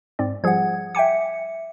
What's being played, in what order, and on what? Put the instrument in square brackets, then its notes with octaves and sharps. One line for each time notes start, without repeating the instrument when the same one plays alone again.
[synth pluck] G#2 C4 D5
[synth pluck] F3 G3 G#4 [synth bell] F#5 G#6
[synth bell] E5 C#7 [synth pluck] G5 G#5 D6